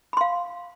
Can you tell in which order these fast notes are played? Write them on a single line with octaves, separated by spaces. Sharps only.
B5 C6 F5